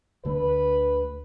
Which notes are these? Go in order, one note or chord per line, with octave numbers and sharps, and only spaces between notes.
D2 D3 A3 B4